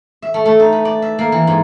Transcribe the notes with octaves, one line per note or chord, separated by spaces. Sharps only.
E5
A3
A3
D#4
B4
D5
E5
A#3
E3
G#2